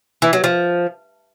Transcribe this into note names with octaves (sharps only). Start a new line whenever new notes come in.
E3
F#3
F3